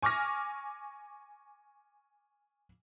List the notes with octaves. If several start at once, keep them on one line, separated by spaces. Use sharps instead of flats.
G#5 C#6 D6 F6 A#6